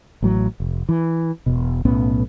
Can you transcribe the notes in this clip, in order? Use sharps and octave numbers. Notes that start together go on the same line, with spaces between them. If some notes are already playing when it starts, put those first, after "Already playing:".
A1 A2 F#3
F1
E3
E1 B2
B1 A2 B3 C#4